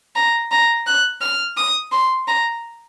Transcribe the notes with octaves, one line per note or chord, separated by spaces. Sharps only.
A#5
A#5
F#6
F6
D#6
C6
A#5